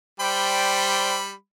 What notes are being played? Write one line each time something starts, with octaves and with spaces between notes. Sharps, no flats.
G3 C5 D5 G5 B5